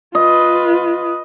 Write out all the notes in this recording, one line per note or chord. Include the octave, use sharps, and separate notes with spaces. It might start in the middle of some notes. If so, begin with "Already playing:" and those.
F4 B4 D#5